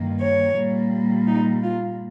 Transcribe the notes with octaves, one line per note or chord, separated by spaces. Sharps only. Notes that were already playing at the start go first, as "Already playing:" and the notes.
Already playing: G2 D#3 A#3
C#5
A#2 G3 A#3
D#4
F4